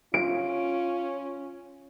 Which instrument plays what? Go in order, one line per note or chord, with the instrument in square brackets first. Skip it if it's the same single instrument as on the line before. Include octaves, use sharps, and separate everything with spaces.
[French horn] C#4 [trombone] F4 [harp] D7